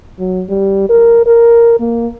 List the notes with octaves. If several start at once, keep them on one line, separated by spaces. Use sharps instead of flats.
F#3
G3
A#4
A#4
A#3